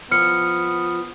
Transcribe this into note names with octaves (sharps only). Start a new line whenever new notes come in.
F3 B3 F6 C#7